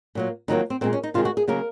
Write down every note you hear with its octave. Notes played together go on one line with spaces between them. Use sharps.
A#2 F#3 A#3
F2 D#3 F#3 A#3 D#4
C4
A#2 G#3 C4
C#4
D#4
C3 D#3 G#3 F4
F#4
G#4
C#3 F#3 A#3 A#4